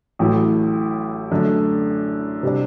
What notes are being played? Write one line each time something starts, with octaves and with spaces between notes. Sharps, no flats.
A1 A2 F#3 A3 E4
F#2 D3 A3 D4
C3 G3 D4